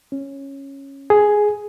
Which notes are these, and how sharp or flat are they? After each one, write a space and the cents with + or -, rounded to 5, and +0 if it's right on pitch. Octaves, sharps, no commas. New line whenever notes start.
C#4 -10
G#4 +5